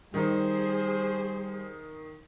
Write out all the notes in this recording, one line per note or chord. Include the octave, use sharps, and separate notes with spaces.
D#3 G3 D#4 G#4 C5